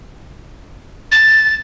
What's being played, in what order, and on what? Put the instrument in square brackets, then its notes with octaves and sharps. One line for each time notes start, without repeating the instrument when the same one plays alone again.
[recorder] A6